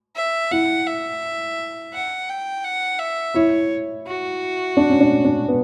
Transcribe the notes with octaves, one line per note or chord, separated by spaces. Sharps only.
E5
E4 F#5
E5
F#5
G5
F#5
E5
E4 C#5
F#4
D4
C#4
D4
D4
B3